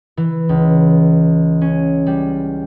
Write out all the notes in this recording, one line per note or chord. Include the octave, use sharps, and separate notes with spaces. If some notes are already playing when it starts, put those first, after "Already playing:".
E3
C#2
C#4
G3